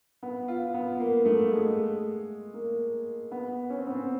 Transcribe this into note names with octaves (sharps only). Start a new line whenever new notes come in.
B3
F4
B3
A#3
A3
G#3
A#3
B3
C#4
C4
B3
C4